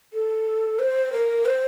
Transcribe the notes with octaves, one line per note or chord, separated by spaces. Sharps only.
A4
C5
A#4
C5